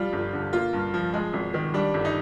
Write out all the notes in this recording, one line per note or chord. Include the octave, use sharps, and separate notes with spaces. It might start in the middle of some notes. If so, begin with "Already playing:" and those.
Already playing: F3 G3 F4
G1
D3
A#3 F4
G2
F3
G#3
G#1
D#3
G3 D4
G1
D#4